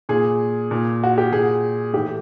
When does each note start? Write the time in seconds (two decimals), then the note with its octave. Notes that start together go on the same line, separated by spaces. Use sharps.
0.09 A#2 G#4
0.71 A#2
1.04 F#4
1.18 G4
1.32 A#2 G#4
1.93 A2 E3 G4